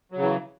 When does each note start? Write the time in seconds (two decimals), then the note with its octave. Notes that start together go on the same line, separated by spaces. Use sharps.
0.12 F#3
0.17 C#3
0.21 E3